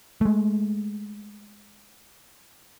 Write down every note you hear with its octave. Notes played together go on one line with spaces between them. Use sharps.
G#3 A3